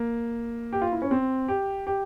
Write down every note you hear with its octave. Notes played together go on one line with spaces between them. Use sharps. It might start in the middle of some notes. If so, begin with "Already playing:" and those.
Already playing: A#3
G4
F4
E4
C#4
C4
G4
G4